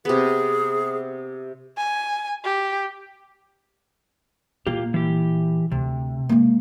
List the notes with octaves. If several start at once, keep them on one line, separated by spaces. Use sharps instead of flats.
C3 B3 G#4
G#5
G4
A#2 A#3 F4 G4
E3 G4
D2 C3
G#3 A#3